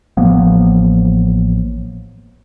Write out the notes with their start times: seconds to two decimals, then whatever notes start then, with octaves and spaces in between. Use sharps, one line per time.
0.17 A1 F3 A#3 B3